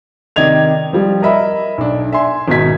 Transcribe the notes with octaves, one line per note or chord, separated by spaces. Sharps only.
C3 D#3 D5 D#5 G#6 F7
F3 G3
A#4 D#5 E5 B5
B1 D4
E5 G#5 C6
G#1 B2 D#4 F#4 G#6 B6